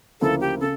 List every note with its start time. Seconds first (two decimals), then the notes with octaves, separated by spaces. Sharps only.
0.21 D2 C#3 F3 A#3 E4 A4
0.41 G4
0.60 C#3 A4